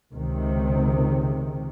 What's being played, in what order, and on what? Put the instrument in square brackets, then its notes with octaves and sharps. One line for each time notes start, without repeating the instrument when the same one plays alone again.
[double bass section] C#2 C3 D#3